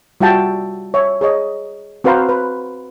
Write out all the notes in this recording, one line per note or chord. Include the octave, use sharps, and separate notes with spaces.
G3 F4 F#4 E5 G5 A5
C#5 E5
G#4 C#5 D#5
C4 F#4 B4 C5 F5 A#5
B4